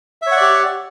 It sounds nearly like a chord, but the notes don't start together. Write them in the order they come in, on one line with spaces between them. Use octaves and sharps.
E5 C#5 F#5 D5 G4